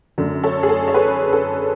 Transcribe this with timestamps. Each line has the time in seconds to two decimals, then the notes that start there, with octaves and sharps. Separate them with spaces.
0.18 F#2 D3 A3
0.43 A4 C#5
0.63 G#4
0.69 A4
0.88 C#5
0.94 G#4 B4
1.33 A4 C#5